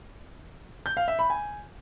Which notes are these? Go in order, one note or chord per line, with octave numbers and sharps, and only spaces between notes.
G6
F5
E5
B5
G#5